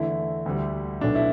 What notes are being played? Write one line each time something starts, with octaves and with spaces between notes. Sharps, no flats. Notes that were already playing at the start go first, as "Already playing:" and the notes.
Already playing: E2 D3 A3 E4
D2 D3 G3
B1 B2 A3 D4
E4